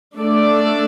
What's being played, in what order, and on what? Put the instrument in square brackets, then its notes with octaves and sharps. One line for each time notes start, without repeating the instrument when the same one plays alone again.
[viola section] A3 D4 A4 D5